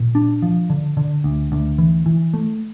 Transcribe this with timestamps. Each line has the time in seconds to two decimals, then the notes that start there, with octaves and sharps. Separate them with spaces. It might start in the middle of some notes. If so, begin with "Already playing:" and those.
Already playing: A#2
0.15 D4
0.42 F3
0.70 D3
0.97 D3
1.24 D2
1.52 D2
1.78 E3
2.06 E3
2.34 A3